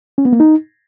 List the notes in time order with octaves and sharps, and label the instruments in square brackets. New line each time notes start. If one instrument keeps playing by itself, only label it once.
[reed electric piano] C#4
B3
A#3
D#4